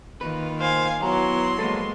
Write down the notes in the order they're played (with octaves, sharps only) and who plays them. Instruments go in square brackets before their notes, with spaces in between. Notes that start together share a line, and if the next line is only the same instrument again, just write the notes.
[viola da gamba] D#3 A#3 F4 [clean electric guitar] B4
[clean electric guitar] C5 [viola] F5 G#5
[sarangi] F#3 [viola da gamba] B3 E4 [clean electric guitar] A#5 [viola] C6
[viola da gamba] F3 G#3 A#3 [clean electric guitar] A4 B4